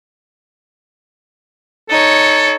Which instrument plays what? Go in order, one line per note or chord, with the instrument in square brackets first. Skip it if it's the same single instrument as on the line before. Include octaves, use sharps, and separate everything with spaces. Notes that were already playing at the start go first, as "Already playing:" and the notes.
[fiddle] D#4 C#5 [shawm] A4